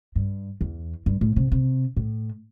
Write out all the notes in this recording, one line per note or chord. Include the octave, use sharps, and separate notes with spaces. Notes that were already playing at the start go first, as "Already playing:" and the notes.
G2
E2
G2
A2
C3
C3
A2